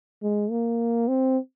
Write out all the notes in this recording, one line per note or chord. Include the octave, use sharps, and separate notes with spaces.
G#3
A#3
C4